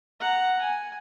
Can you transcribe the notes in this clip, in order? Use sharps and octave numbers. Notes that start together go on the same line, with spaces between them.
F#5 A#5
G#5